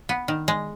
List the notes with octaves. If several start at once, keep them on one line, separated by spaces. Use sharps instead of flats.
B3
D#3
G#3